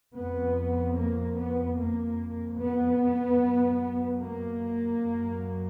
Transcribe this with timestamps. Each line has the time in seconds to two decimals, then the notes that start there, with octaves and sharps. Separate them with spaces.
0.15 F2 B3
0.96 A#3
1.37 B3
1.77 F2 A#3
2.58 B3
3.39 F#2
4.20 A#3
5.01 F#2